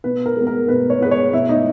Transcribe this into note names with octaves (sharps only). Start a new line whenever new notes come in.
B2 B4
A#4
G#3 B3
A#4
B2 B4
C#5
G#3 B3 B4
C#5
B2 E4
D#4